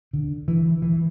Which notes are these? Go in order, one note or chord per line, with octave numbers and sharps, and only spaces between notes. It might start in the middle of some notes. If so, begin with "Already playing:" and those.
D3
E3
E3